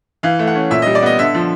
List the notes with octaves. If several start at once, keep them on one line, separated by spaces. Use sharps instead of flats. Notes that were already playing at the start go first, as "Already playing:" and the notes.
E3 F5
A3
F#5
C#4
A#2 E5
D#5
G3
D5
B3 D#5
D3 E5
F3